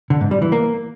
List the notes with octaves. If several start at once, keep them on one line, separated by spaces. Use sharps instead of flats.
D3
G#2
G3
E3
A#3